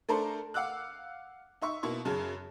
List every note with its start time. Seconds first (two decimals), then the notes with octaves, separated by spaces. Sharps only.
0.09 A3 D4 A4 A#4 C5
0.54 F5 F#5 D6 E6 F#6
1.62 D#4 E5 C#6
1.83 B2 A#3 E4 C#6
2.05 F#2 C#3 G#4 A5